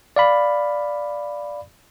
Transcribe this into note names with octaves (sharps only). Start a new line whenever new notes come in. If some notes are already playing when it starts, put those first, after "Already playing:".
D5 F5 B5